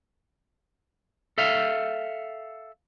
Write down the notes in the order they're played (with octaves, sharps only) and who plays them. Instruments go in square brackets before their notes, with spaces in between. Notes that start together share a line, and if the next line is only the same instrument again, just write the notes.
[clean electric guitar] A4 E5 F5